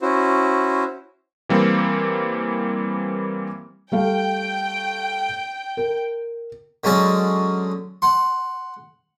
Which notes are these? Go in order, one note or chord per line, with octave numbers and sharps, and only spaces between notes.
C#4 E4 F#4 C5
E3 G3 A#3 C4
G3 A3 F5 G5
A#4
D3 F#3 G#3 C#4 A5
F#5 C6